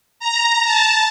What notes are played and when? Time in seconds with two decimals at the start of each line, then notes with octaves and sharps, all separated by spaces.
0.19 A#5
0.65 A5